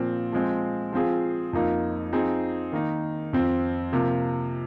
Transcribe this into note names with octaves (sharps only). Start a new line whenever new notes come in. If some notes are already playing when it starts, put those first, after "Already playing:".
Already playing: A#2 F3 C4
F3 G#3 C4
F3 C4 F4 G#4
F2 F3 A#3 D#4
F3 C4 D#4 G#4
D#3 A#3 D#4
F2 F3 C4
C3 F3 A#3